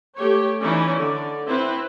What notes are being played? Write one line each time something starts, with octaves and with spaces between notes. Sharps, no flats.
A3 G4 C#5
E3 C#4 D#4 E4 D5
D3 D5
C4 E4 B4